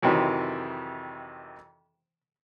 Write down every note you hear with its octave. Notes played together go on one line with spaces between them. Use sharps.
F2 C3 D#3 E3 F#3